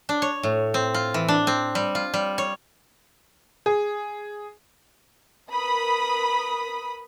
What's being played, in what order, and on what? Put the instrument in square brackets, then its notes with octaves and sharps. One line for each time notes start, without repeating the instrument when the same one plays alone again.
[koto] D4
C#5
A2
C4
F4
E3
D4
C4
G3
F4
G3
C#5
[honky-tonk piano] G#4
[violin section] A#4 B4 B5 D#6 B6